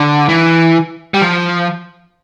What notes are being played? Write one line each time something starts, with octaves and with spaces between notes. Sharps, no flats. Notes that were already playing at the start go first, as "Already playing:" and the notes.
Already playing: D3
E3
G3
F3